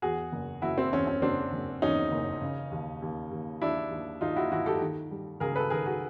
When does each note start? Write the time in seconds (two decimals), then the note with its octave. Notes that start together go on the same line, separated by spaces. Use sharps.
0.02 E2 F#4 G#4
0.32 F#1
0.62 F#1 E4 F#4
0.78 C4
0.92 E2 C#4
1.07 C#4
1.22 F#1 C4 D4
1.53 F#1
1.82 E2 C#4 D#4
2.12 F#1
2.41 C#3
2.71 D#2
3.02 D#2
3.31 D#2
3.61 D#2 D4 E4
3.91 D#2
4.21 D#2 D#4 F4
4.36 E4 F#4
4.51 D#2 E4 F#4
4.66 G4 A4
4.81 D#3
5.11 G3
5.40 C#2 G#4 A#4
5.55 A4 B4
5.70 D#3 G#4 A#4
5.86 F#4 G#4